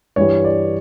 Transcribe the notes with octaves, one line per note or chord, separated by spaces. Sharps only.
G2 E3 G3 C#5
D5